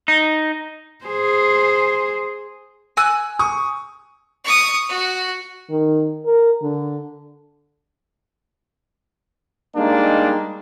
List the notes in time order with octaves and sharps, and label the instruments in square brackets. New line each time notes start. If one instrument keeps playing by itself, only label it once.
[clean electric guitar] D#4
[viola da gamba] G#4 C5
[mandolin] G#5 E6 F#6
[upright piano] C#6 D#6
[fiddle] C#6 D#6
F#4
[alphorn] D#3
A#4
D3
[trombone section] G3 G#3 A#3 D4 D#4